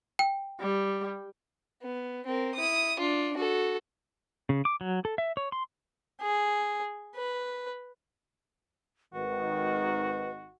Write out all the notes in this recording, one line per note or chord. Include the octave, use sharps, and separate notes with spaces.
G5
G3
B3
C4 A#4
E4 D#6
D4 F4
F#4 A4
C#3
D6
F#3
A4
E5
C#5
C6
G#4
B4
G#1 D#3 F#4 B4